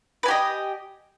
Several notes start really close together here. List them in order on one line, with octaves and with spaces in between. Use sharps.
B4 G#5 G4 D#5